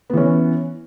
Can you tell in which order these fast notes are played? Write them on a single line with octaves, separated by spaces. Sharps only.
B3 E3 C#4